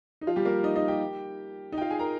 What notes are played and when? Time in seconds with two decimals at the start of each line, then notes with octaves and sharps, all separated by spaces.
0.21 D#4
0.27 F3 F4
0.36 G3 G4
0.45 A#3 A#4
0.64 D#4 D#5
0.76 D#4 D#5
0.88 G4 G5
1.72 D#4 D#5
1.78 G5
1.81 F4 F5
1.91 G#4 G#5
1.99 A#4 A#5